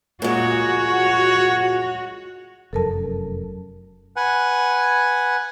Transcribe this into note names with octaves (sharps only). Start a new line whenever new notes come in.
A#2 G#3 F#4 C#5
F1 F#2 A4 A#4 A5
B4 F#5 G#5